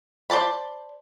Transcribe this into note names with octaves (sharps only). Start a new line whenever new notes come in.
C5 D5 A5 B5